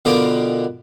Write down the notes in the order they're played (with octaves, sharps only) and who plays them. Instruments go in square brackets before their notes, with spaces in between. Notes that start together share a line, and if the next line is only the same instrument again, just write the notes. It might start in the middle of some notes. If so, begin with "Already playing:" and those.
[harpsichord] B2 D3 F3 B3 G4 A#4